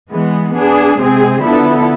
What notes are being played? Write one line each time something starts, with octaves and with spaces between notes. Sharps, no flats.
E3 G#3 B3
B3 D4 G#4
C3 G#3 C4 G#4
D3 F3 B3 E4 A4